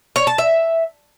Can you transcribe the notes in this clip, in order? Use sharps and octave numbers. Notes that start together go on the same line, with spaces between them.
C#5
A5
E5